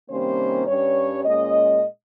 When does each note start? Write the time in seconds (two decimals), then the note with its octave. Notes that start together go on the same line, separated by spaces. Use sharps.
0.09 C3 D#3 G3 A#3 C#4 C5
0.67 G2 G3 C#4 C#5
1.25 A#2 G#3 C#4 D#5